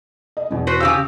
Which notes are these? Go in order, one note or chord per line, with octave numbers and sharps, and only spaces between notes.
D#5
E2 B2
F#4 B4 C5
C#3 G4 F5 E6